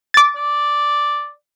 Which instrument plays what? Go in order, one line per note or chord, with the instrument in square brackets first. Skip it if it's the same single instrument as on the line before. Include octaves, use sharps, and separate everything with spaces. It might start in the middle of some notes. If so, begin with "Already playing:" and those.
[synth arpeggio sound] D6 A6
[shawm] D5